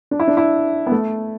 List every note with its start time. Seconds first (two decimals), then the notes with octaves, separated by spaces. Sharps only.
0.11 D4
0.19 E4
0.28 D4
0.37 E4
0.86 B3
0.92 A3